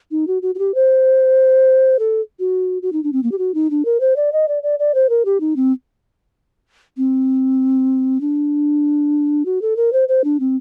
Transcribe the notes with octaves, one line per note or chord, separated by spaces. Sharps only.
D#4
F#4
F#4
F#4
G4
C5
A4
F#4
F#4
D#4
D4
C4
A#3
G4
F#4
D#4
D4
A#4
C5
D5
D#5
D5
D5
D5
C5
A#4
G4
D#4
C4
C4
D4
F#4
A4
A#4
C5
C5
D4
C4